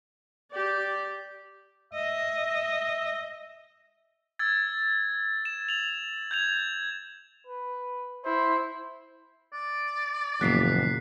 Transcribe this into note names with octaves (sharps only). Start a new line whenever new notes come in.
G4 D5
D#5 E5
E6 G#6 A6
E7
F7 F#7
G6 G#6 F7
B4
E4 C5
D5
F#1 E2 A#2 F3 F#6 B6 C7